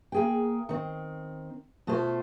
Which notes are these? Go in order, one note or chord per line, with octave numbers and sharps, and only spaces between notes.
A#3 G#4 G5
D#3 C4
B2 A3 F4 A4 C5